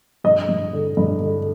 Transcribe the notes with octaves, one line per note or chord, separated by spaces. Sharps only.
G2 D#5
G2
D3
G2
D3